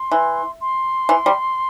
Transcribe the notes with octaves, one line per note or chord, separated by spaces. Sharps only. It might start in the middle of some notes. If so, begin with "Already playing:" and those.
Already playing: C6
E3
C6
E3
G3